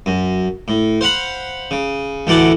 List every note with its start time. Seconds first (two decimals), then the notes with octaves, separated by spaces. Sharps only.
0.06 F#2
0.68 A2
1.01 C5 F5 F#5 B5
1.71 C#3
2.27 D2 A2 E3 F#5 A5 D6